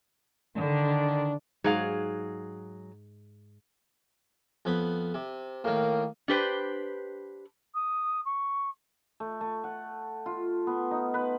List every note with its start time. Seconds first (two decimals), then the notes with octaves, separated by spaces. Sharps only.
0.55 D3 D#3 D4
1.64 G#2 F#3 G#4 F5 F#5
4.65 F2 B3 B5
5.14 C3
5.64 A2 D#3 A#3
6.28 D4 G4 B4 C5
7.75 D#6
8.25 C#6
9.20 A3
9.41 A3
9.64 F#5
10.26 F4
10.67 B3
10.91 D#4
11.14 B4